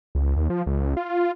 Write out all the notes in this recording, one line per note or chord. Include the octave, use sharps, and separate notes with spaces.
C#2
D#2
F3
C#2
F4